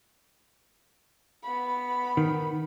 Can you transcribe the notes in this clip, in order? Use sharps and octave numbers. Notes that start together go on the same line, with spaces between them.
B3 B5
D#3